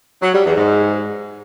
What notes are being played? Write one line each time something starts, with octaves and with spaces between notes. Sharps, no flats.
F#3
G3
E2
G#2